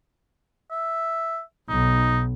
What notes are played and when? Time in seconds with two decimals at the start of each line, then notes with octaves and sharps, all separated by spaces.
0.71 E5
1.69 B1 D#4